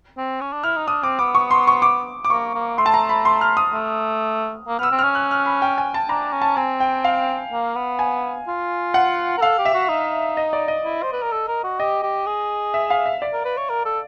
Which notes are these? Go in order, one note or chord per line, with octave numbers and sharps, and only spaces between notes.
C4
C#4
D4
E4 F6
D#4
D4 D#6
C4 D6
B3 D6
C#6
C6
C#6
D6
D6
A#3 C#6
A#3
A3 C6
A5
A#5
B5
C6
F6
D#6
A3
A#3
B3 E6 F6
C4
C#4 F6
F#6
F6
B5
G5
G#5
A5
D4 A#5
C#4
A5
C4 G#5
G5
F5
A#3
B3
G#5
F4
F#5
A#4
A4 F5
G4
E5
F#4
D#4
D#5
D5
D#5
E4
C5
B4
A#4
A4
A#4
F#4
G4 D#5
G4
G#4
E5
F5
E5
D5
A#4
B4
C#5
A#4
A4